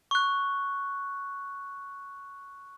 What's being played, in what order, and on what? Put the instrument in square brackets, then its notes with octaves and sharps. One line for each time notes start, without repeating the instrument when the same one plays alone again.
[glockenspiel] C#6 F#6